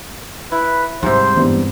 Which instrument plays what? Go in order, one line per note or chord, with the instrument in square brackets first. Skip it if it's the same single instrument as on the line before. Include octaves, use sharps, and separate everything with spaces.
[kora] E4 [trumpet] B4
[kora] G#2 C3 [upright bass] G3 [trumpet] C5
[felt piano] E2 G2 E3